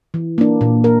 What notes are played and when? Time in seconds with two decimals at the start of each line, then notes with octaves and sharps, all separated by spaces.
0.14 E3
0.38 A#3 D4
0.61 A#2
0.84 A#4